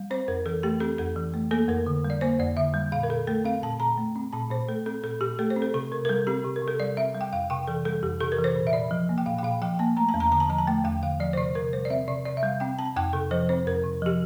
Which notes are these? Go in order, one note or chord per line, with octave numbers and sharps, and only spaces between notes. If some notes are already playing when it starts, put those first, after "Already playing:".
Already playing: G3
C4 C5
F2 A#4
E3 A4
A3 G4
C4 A4
F2 A4
E3
A3
A#3 A4
F2 A#4
D3
G3
D5
A#3 C5
F2 D5
D3 E5
G3
A#2 F5
A#4
A#2 A4
A3 A4
C4 F5
A#2 A5
A#2 A#5
A3
C4
A#2 A5
A#2 C5
A3 A4
C4 A4
A#2 A4
A#2 G4
A3 A4
C5
C4
A4
C3 A4
C3 A#4
A#4
G3 A4
C4 G4
C3
A#4
C3
A4
G3 D5
C4 E5
G3
G5
F2 F5
C3 G5
E3 A4
G3 A4
F2 G4
C3 A4
A#4
E3
C5
A#2
E5
A#2 D5
F3
A#3
G5
A#2 F5
G5
A#2 F5
F3 G5
A#3 A5
A3 A#5
A5
E2
A#5
D3 A#5
A5
F3 A#5
A5
A3 G5
E2 G5
D3 F5
F3 D5
C5
C3 D5
C3 A#4
G3 C5
D5
C4 E5
C3 D5
C3 D5
E5
G3 F5
C4 G5
C4 A5
F2 G5
C3 A4
F3 C5
C4 C5
F2 A#4
C3
F3 G4